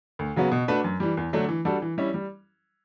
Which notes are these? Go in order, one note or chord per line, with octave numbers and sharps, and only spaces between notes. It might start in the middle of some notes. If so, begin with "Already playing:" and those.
D2
C#3 F#3 B3 F#4
B2
A3 D4 F#4 B4
F#2
E3 G3
E2
D3 F#3 A3 D4
E3
G3 D4 F#4 A4
E3
G3 C#4 E4
G3